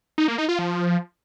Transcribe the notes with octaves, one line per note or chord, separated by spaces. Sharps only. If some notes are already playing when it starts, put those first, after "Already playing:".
D#4
A#3
D#4
F4
F3